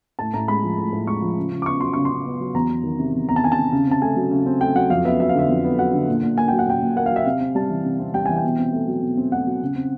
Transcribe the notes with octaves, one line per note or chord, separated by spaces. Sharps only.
A2 A5
A2 A#5
G#3 B5
F3
A2
A2
G#3 C#6
F3
C#3
C#3
D6
B3 C#6
F#3 C6
C#3 C#6
C6
C#3
B3
F#3
E2 A#5
E2
D#3
C3
E2
E2 A#5
A5
D#3 G#5
A5
C3
C#3
C4 A5
A3 G#5
F#3
C#3
C4
A3 G5
F#3 F#5
F2 F5
B3 E5
F#3 E5
F5
D3 E5
F2
B3
F#3 F#5
D3
A#2
A#2
A#3 G#5
F#3 G5
F#5
A#2 G5
A#2
A#3 F#5
F5
F#3 E5
C3 F5
C4
G3 A5
E3
C3
C4
G3 G5
E3 G#5
G5
B2
C4
A3
F#3
B2
C4
A3 F#5
F#3
C#3
C4